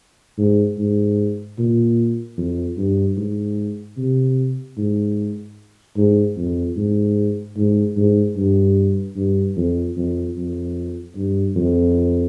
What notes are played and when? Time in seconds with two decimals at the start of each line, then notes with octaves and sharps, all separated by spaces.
0.38 G#2
0.79 G#2
1.58 A#2
2.38 F2
2.78 G2
3.17 G#2
3.98 C3
4.78 G#2
5.97 G#2
6.37 F2
6.76 G#2
7.56 G#2
7.97 G#2
8.37 G2
9.16 G2
9.57 F2
9.97 F2
10.36 F2
11.16 G2
11.56 F2